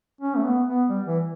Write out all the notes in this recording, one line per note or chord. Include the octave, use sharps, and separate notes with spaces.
C#4
A3
B3
B3
G3
E3